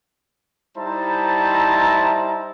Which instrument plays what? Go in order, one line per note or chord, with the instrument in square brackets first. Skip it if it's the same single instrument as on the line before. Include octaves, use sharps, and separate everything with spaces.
[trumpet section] G3 D#4 E4 C5 A5 A#5